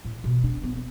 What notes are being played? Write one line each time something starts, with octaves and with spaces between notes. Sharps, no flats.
A2
B2
D4
B3